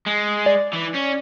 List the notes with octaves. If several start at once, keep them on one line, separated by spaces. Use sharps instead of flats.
G#3
D5
E3
C#4